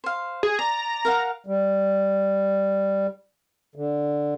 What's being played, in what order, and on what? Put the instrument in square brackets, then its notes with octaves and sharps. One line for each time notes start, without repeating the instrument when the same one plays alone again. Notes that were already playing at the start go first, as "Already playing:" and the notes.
[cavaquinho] C5 F5
[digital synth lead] G#4
[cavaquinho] D5 [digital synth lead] A#5
[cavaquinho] A#4 F5 F#5
[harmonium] G3
D3